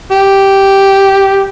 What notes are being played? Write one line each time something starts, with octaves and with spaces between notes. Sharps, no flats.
G4